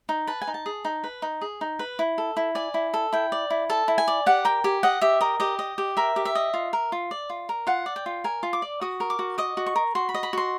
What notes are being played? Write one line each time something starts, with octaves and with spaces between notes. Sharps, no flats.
D#4
B4 A5
G#5
D#4
A5
G#4
D#4
B4
D#4
G#4
D#4
B4
E4
A4
E4
D5 G#5
E4
A4
E4 G5
D5
E4
A4 A5
E4
G#5
D5
G4 F#5
A#4 G5
G4 G#5
D#5 F#5
G4 E5
A#4 D#5
G4 D#5
D#5
G4
A#4 E5
G4
E5
D#5
F4
A#4
F4
D5
F4
A#4
F4 F#5
D5
G5
F4
A#4 G#5
F4
D6
D5
F#4 D#6
A#4
D6
F#4
D#5 D6
F#4
C#6
A#4
F#4 C6
B5
D#5
B5
F#4 C6